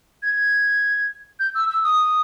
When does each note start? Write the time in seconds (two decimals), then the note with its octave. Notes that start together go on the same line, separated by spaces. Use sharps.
0.23 G#6
1.40 G6
1.55 E6
1.69 E6
1.84 D#6